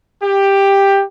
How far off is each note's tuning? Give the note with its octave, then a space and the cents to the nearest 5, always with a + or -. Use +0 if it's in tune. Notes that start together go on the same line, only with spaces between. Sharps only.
G4 +10